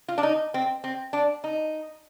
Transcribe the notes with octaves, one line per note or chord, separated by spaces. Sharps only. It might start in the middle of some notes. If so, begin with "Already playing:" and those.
F4
D4
D#4
C4
C4
D4
D#4